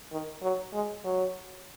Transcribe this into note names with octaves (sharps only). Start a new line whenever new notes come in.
D#3
F#3
G#3
F#3